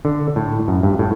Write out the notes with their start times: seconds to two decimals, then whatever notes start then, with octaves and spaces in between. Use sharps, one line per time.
0.05 D3
0.36 A2
0.68 F#2
0.83 G2
0.99 A2